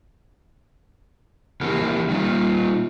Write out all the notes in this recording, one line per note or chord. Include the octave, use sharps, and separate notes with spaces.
E3 A#3 E4 F#4 G4 A#4
G3 A#3 D#4 F4